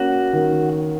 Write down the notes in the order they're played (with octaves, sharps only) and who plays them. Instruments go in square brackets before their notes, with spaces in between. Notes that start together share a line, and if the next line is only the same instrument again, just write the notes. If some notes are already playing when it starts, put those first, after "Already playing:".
Already playing: [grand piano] A#3 C#4 [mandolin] F#4
[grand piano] D#3